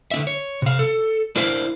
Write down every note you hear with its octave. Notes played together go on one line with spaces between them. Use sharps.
D3 D4 E5
C#5
C3 F5
A4
D4 E4 A#4 C5 E5 F5